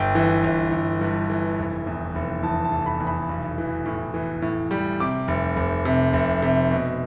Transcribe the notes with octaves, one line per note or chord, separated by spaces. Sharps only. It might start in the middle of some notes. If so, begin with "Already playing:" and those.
Already playing: G1 G5
E3
G1
G1
G2
E3
F1
E2
F1
E2 A5
A5
F1
B5
E2
B5
B1
E3
A2
E3
A2
G3
C3 D6
F1
F1
C3
F1
C3
B2